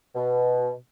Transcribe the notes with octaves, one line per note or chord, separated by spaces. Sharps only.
B2